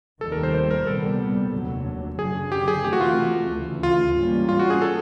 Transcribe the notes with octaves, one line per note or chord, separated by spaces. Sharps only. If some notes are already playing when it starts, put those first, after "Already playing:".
F1 D#2 D#3 G3 A4
A#4
C5
C5
A#4
C2 A#2 G3 B3 A4
F1 D#2 D3 F#3
F#1 F#2 D3 F#3 G#4
G4
G#4
F2 C3 E3 A3 G4
F#4
F4
D2 C#3 E3
F4
G#2 E3 G3 A#3 C#4
F4
F#4
G#4
A4